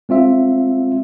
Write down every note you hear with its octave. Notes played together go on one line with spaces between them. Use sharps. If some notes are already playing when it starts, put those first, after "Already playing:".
G#3 C4 F4 E5